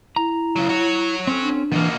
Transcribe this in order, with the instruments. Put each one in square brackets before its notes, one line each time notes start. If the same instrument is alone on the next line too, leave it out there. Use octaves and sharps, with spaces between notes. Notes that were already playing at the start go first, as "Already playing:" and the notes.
[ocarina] E4 [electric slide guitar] A#5
[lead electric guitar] C#3 F#3
F#4 C#5
[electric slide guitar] C4 C#4 A4
[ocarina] D4
[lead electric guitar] B2 A#3 [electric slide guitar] D#3 E3